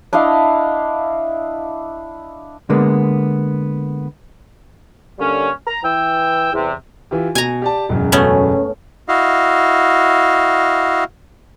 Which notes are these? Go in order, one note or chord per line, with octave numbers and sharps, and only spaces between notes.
D4 E4 D#5 F5
D3 G#3 A#3 B3
D3 G3 A#3 C#4
A#5
E3 G5 E6
E2 C3
E3 F4 G4
B2 G#5 A#5
G4 D5 A5
E1 F#2 C#3
A3 B3 C#4
E4 F#4 D#5 F5